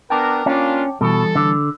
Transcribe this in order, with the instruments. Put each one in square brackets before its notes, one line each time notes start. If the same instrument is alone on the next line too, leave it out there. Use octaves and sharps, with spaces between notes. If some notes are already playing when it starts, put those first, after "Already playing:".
[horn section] B3 D4 A#4 [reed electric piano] G5 A5 D6
[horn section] A#3 D4 F4 [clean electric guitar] C#4
[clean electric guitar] B2 [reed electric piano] E3 G3 [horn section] A4
[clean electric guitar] D3